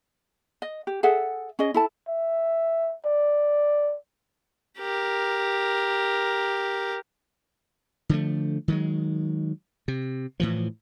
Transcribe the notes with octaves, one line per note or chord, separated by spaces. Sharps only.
D#5
G4
G#4 A4 E5 F#5
C#4 G#4 D#5
E4 A4 A5
E5
D5
G4 A#4
D3 F3 A3
D#3 F#3 G#3
C3
A2 E3 F3